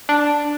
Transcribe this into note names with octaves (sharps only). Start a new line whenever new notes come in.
D4